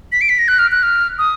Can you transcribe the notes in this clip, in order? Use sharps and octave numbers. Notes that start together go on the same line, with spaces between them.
B6
D7
B6
A#6
F#6
F6
F#6
F6
D#6